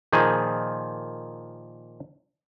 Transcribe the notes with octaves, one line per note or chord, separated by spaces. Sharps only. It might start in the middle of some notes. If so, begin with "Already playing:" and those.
A#2 D#3 F3 G#4